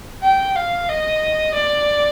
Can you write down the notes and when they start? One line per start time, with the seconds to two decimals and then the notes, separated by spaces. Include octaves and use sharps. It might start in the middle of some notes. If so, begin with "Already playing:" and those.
0.23 G5
0.56 F5
0.89 D#5
1.54 D5